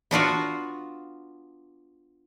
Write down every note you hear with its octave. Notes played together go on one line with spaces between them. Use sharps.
B3 D4 F4 F#4